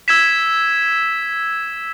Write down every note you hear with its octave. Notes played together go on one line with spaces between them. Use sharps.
E6 G#6 B6 E7